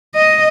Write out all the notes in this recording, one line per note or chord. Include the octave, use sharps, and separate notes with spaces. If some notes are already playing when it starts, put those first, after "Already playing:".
D#5